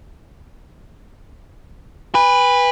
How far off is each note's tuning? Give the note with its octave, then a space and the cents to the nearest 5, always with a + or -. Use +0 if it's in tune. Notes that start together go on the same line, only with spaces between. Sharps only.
B4 +0 G#5 -40